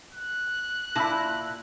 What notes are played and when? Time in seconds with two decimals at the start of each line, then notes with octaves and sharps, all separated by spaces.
0.13 F#6
0.95 A#2 E4 A5 B5 E6 A#6